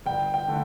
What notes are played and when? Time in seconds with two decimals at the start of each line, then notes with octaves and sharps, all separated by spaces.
0.06 G1 G5
0.34 G5
0.47 D3 A3 D4